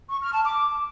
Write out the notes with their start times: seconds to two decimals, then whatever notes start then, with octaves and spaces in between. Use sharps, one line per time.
0.10 C#6
0.21 F6
0.33 A5
0.45 D6